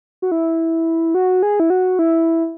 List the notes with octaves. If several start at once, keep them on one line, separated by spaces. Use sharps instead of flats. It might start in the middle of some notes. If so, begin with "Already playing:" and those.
F#4
E4
F#4
G#4
E4
F#4
E4